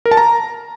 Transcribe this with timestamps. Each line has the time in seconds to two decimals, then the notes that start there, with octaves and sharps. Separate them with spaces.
0.06 A#4
0.11 A5
0.17 A#5